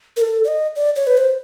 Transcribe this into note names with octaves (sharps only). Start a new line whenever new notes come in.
A#4
A4
D5
D#5
D5
C#5
B4
C5